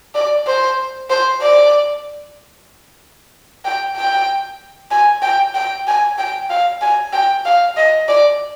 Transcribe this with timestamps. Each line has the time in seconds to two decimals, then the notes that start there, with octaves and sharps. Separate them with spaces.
0.15 D5
0.47 C5
1.10 C5
1.42 D5
3.65 G5
3.96 G5
4.91 G#5
5.22 G5
5.54 G5
5.87 G#5
6.18 G5
6.50 F5
6.81 G#5
7.13 G5
7.45 F5
7.77 D#5
8.08 D5